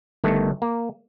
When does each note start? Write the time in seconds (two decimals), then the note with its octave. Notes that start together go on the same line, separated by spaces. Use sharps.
0.24 G1 G2 D#3 A3
0.62 A#3